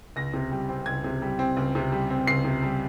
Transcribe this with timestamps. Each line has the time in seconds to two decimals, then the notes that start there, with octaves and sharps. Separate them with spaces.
0.16 C#2 A#6
0.33 C3
0.51 G3
0.69 C4
0.86 C#2 G#6
1.04 C3
1.22 G3
1.39 C4
1.57 C#2
1.75 C3
1.92 G3
2.10 C4
2.27 C#2 C7
2.45 C3
2.63 G3